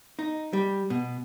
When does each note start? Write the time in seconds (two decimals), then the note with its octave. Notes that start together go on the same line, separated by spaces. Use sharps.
0.19 D#4
0.53 G3
0.90 B2